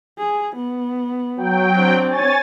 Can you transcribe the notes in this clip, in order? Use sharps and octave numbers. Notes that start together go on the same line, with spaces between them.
G#4
B3
F#3 G5
C4 D4
C#5 G#5 A6